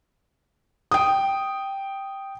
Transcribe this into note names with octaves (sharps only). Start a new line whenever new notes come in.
G5 D#6